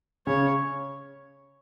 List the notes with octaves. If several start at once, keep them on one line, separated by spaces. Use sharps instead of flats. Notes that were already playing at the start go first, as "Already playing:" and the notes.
C#3 C#5